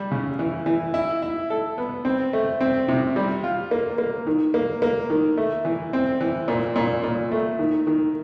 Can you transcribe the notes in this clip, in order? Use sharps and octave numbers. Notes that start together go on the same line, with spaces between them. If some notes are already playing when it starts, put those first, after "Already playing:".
Already playing: G3
C#3
E3
E3
E4
E4
A4
B3
C4
A3
C4
C3
G3
F4
A#3
A#3
D#3
A#3
A#3
D#3
A3
E3
C4
E3
A#2
A#2
A#2
A3
D#3
D#3